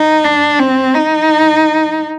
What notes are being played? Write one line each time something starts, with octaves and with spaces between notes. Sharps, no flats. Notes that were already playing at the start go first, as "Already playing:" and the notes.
Already playing: D#4
D4
C4
D#4